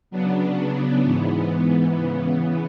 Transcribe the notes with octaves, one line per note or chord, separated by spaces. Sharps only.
C#3 F#3 B3 D4
G#2 E3 B3
C#3 E3 B3